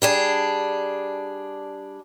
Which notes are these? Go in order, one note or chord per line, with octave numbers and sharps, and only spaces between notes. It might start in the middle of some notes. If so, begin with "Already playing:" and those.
G3 D4 G#4